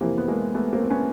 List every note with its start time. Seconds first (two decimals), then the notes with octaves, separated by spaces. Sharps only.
0.01 F2 C3 E3 A#3 C4
0.18 B3
0.28 G#3 A#3
0.55 A3 B3
0.73 A#3 C4
0.83 C4
0.90 B3 C#4